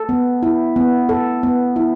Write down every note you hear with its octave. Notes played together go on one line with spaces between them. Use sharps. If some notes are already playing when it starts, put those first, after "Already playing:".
Already playing: A4
B3
E4
B3
A4
B3
E4